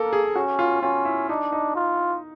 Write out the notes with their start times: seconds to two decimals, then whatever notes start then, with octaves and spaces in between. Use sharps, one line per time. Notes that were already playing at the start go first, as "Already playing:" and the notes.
Already playing: A#3 A4 A#4
0.13 G#4
0.35 C#4 F#4
0.59 F4
0.82 C#4 F4
1.05 E4
1.29 D4 D#4
1.52 D#4
1.76 F4